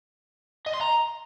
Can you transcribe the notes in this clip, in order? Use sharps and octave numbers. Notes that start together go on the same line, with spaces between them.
D#5
C6
A#5